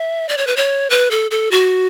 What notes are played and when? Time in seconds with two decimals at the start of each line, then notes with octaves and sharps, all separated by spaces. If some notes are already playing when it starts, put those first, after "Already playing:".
Already playing: E5
0.29 D5
0.38 C#5
0.47 B4
0.56 C#5
0.90 B4
1.11 A4
1.31 A4
1.51 F#4